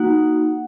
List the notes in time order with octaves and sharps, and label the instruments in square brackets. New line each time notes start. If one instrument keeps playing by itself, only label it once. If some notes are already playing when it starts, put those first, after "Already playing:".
Already playing: [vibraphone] A#3 D#4 F#4 F#5